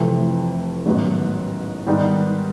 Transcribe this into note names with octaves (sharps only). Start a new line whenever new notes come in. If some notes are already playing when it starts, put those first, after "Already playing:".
Already playing: F1 F2 C3 E3 A3
A1 G#2 D#3 F#3 B3
G#2 D#3 G3 B3 D#4